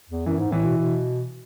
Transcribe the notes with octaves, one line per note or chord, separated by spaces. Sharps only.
E2
F#2 E3
G#2
A2 E3
B2
B2